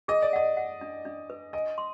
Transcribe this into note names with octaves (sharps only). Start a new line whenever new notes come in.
G#4 D#5
D5
D#5 F#5
F#5
D4
D4
B4
D#5 G#5
C6